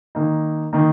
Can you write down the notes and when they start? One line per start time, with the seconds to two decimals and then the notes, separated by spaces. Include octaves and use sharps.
0.15 D#3 A#3 D#4
0.73 D#3 A#3 D#4